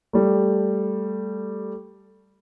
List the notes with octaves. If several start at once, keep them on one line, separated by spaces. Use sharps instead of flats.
G3 A3